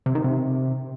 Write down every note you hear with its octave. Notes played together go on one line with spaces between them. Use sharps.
C3
D#3
C3